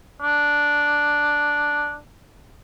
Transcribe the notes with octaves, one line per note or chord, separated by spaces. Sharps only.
D4